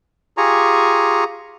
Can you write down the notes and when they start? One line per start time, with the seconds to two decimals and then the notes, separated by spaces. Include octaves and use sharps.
0.38 F4 G4 G#4 G#5 A#5 C#6